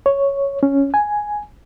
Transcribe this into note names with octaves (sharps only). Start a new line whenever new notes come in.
C#5
C#4
G#5